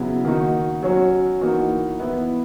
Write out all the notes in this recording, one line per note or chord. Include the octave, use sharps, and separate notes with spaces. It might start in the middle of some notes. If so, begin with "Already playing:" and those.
Already playing: C#3 F#3 B3 E4
D#3 A#3 D#4 F#4
F#3 C#4 F#4
E3 A#3 D#4 F#4
E3 B3 E4